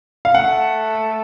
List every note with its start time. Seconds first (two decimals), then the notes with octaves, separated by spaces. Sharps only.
0.25 F5
0.35 A3 F#5